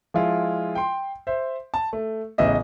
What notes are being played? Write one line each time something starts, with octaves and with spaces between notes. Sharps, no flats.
F3 G#3 E4 F4
G5 C6
C5 E5
A5
A3
A1 C#3 B3 D#5 E5